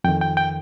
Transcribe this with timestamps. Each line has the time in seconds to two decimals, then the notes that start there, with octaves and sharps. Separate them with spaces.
0.04 F2 D#3 G5
0.21 G5
0.37 G5